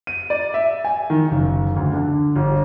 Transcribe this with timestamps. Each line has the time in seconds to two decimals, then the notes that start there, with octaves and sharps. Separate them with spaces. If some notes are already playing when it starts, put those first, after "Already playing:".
0.07 D#7
0.30 D5
0.54 E5
0.85 G#5
1.10 D#3
1.31 F#1
1.76 D2
1.93 D3
2.35 G1